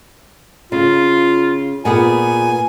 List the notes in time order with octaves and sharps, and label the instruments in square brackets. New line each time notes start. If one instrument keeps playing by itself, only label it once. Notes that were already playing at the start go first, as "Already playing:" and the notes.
[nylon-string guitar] C#3 [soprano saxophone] F4
[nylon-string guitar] A#2 B3 G#4 [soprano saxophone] G#5